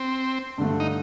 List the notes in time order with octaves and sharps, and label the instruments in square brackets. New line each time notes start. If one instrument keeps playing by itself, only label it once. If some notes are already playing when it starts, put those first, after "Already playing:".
Already playing: [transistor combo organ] C4
[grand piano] G2 D3 A3
[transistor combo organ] D#4